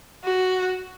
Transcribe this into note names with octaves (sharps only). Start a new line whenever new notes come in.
F#4